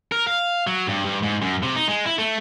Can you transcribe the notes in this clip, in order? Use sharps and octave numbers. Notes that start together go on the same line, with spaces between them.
A#4
F5
F#3
G2
G2
G#2
F#2
C3
D#4
G#3
E4
A3